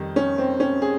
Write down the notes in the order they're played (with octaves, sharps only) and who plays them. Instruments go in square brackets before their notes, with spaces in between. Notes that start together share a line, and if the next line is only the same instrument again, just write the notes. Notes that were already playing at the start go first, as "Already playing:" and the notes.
Already playing: [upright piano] F2 D#3 G3
C#4
C4
C#4
G#4